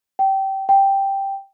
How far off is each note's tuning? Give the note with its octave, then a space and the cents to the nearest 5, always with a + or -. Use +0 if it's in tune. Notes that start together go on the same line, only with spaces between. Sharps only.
G5 -20
G5 +0